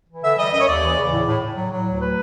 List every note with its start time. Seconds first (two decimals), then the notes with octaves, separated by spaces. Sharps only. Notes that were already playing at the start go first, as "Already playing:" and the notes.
0.08 E3
0.23 D3 E5
0.38 G3 D#5
0.53 F#2 D#5
0.60 C#5
0.67 D#2 D5
0.82 E3
0.96 C#3
1.12 A2
1.27 A2
1.41 A2
1.56 F#3
1.71 F#3
1.86 D2
2.00 B4